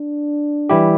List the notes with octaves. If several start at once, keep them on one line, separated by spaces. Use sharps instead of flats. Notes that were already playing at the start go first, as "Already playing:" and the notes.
Already playing: D4
E3 G3 E4 G4